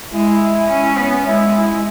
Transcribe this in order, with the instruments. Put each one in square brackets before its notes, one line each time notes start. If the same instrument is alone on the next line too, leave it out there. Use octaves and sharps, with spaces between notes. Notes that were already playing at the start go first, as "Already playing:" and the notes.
[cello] G#3 [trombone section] E4
[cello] C#4
[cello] B3 [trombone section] C#4
[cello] G#3 [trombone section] E4
[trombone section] E4